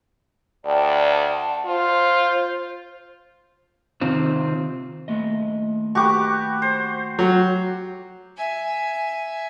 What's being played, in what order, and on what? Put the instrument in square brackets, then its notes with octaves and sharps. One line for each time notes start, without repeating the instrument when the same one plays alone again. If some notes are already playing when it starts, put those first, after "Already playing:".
[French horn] D2 [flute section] D5 G5 A5
[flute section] F#5 A5
[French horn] F4 [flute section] C5
[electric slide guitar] C3 D#3 C4 F4
[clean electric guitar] D#2 A3 D#5
[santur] F#4 G4 B4 [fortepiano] C#6 D6
[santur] C5
[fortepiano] F#3
[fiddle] E5 G#5